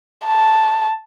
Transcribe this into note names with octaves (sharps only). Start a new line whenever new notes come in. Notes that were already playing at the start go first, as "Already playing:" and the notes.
A5